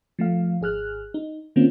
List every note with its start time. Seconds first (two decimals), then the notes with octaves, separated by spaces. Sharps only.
0.19 F3 A3 F5
0.61 G#1 G#4 F6 F#6
1.14 D#4
1.56 D#3 A#3 C4 C#4 F4